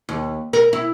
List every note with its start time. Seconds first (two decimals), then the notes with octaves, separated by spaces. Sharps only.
0.09 D#2
0.53 A#4
0.73 E4